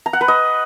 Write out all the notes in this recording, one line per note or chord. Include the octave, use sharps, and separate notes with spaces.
A#5
F#5
B4
D#5